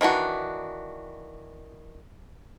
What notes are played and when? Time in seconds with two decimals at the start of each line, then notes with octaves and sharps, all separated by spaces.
0.01 D#3 E3 D4 F#4